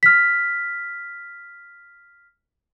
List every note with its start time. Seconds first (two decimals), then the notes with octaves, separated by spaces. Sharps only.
0.03 F6 B6